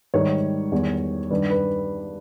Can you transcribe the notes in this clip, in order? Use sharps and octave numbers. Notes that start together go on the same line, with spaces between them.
G#2 D#3 G3 C#5
E2 D#3 G3
G2 D#3 G3 B4
B4